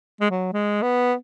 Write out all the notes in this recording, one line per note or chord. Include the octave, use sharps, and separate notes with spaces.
G#3
F#3
G#3
B3